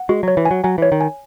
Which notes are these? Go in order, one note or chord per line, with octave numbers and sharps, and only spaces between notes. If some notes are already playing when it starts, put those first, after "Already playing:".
Already playing: F#5
G#3 F#4
F#3 C#5
E3
G#5
F#3
F#3 G#5
E3 C#5
D#3
G#5